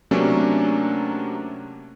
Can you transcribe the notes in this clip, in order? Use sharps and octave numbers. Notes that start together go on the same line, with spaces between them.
C3 F#3 A3 A#3 C#4 D4